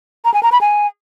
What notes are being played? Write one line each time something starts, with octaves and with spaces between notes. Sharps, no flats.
A#5
G#5
A#5
B5
G#5